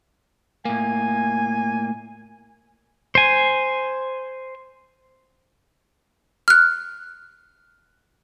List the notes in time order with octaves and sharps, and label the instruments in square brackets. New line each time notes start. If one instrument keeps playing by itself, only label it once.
[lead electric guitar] A2 A#3 [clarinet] G#5
[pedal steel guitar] C5 G#5
[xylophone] F6 F#6